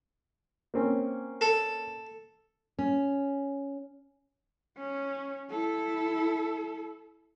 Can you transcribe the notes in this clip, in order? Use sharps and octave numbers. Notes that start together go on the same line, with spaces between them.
A#3 C4 C#4
A4
C#4
C#4
E4 A4